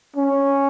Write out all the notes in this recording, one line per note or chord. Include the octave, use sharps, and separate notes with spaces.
C#4